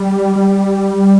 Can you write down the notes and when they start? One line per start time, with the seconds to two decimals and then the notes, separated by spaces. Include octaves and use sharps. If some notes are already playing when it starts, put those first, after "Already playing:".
Already playing: G3
0.36 G3